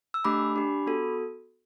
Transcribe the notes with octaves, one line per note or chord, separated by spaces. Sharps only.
E6
A3 D4 G4 B5 D6
D4 G4
B3 F#4 A4